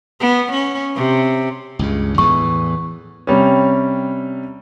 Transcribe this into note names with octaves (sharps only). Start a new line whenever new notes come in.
B3
C#4
C3
C#2 G2 C#3
E2 A2 E3 C#6
C3 G3 C#4